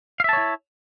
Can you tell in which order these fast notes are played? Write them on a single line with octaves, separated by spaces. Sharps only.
F5 E5 A5 C#5 E4